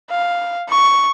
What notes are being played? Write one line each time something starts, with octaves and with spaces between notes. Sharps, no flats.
F5
C#6